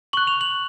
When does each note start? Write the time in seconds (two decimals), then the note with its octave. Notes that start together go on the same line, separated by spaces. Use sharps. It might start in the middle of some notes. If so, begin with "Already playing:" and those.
0.13 C#6 F#6 F#7
0.27 F7
0.41 F#7